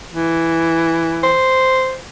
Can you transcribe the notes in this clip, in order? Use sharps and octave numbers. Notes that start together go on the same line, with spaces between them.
E3
C5